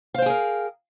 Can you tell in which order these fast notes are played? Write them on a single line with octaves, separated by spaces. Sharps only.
F5 C5 G5 G#4 A#4